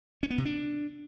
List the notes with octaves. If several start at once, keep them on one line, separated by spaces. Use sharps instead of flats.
C#4
B3
C3
D4